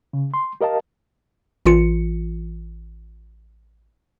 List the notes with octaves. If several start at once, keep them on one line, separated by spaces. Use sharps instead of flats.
C#3
C6
G4 A#4 D#5 F5 A5
A1 E3 F4 C#7